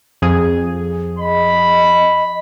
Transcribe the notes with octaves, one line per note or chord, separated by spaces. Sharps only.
F2 G#4
D#5 B5